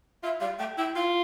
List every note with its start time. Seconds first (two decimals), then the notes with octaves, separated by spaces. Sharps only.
0.23 F4 E5
0.40 G3 F5
0.59 A3 G5
0.77 E4 G5
0.95 F4 F5